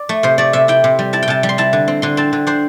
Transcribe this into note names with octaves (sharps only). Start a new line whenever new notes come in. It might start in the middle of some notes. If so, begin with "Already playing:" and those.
Already playing: D5
A3
C3 C5
A3 D5
C3 E5
E4 G5
C3
G3
E4 A5
G5
C3 A5
G3
C6
E4 A5
D3
C4
D3 C6
C4 A5
D3
D4 C5